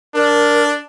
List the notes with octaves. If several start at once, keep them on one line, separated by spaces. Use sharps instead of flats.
D4 A#4